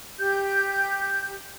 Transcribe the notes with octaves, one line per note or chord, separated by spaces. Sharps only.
G4 G6